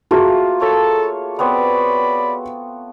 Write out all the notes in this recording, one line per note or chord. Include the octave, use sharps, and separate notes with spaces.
A3 A#3 F4 F#4 G#4
A4 C#5
B3 C4 C#5 D5 B5